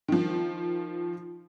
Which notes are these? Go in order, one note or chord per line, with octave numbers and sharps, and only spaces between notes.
D#3 F3